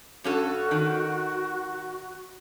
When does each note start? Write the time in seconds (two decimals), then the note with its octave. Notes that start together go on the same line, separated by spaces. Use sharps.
0.24 G2 C#4 F#4 A4
0.71 D#3